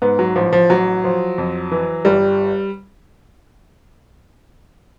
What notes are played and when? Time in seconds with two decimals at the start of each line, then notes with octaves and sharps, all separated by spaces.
0.02 G#2 B3
0.19 F#3
0.35 A1 F3
0.53 F3
0.70 A1 F#3
1.04 F3
1.38 F2
1.71 E3
2.05 G1 G3